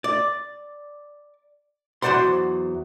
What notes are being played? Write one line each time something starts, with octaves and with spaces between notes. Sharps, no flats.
D5
E2 F#3 C5 D5 F#5 C6